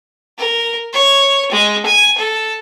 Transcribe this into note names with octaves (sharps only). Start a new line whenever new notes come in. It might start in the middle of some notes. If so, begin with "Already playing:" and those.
A#4
C#5
G#3
G#5
A4